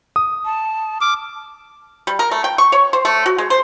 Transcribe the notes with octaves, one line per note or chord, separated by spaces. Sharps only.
D#6
A5
D6 F6
G3
A#4
A3
G5
C#6
C#5
C5
A3
F#4
G#3
C5